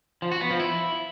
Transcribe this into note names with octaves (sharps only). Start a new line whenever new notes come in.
F3
F#4
B3
F3
E4